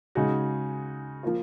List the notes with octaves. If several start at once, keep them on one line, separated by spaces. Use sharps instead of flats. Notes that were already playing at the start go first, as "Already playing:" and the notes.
C#3 G#3 D#4 F#4
F3 A#3 F4